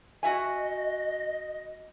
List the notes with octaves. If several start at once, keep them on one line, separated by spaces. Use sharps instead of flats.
F#4 D#5 E5 G#5